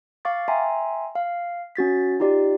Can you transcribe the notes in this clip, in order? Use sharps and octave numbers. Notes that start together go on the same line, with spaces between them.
F5 C#6 D6 A6
E5 G5 G#5 A#5 C6
F5
C#4 F#4 A6 B6
D#4 F4 G4 D5